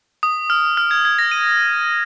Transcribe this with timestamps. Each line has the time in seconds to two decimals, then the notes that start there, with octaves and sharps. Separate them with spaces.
0.23 D#6
0.50 F6
0.77 F6
0.91 G#6
1.05 G#6
1.19 A#6
1.31 D#7